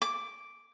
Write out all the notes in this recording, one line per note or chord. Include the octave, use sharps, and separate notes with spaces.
D6